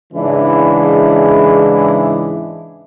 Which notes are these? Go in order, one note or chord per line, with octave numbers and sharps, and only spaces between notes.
G#2 C#3 E3 G#3 D4 E4